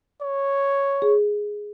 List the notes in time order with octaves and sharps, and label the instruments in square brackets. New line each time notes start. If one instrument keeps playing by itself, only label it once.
[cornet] C#5
[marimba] G#4